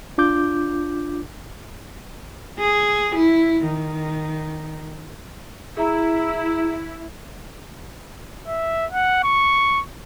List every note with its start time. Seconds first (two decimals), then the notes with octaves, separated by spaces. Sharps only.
0.18 D4 F4 D6 G6
2.59 G#4
3.15 E4
3.65 D#3
5.77 E4 G#4 E5 A#5
8.47 E5
8.92 F#5
9.24 C#6